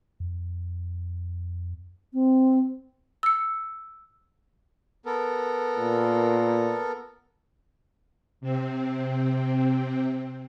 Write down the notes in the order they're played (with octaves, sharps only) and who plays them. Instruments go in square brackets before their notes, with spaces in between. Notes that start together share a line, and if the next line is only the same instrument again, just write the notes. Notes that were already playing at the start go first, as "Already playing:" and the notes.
[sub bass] F2
[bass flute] C4
[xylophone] E6 C#7
[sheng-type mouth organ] B3 A4 A#4
[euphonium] A#2
[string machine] C3 C4